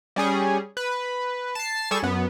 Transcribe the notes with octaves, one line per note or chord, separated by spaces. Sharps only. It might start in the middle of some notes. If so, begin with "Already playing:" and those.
G3 C#4 G#4
B4
A5 C7
G3 G#4 A4 G#5 C#6 E7
F#2 B3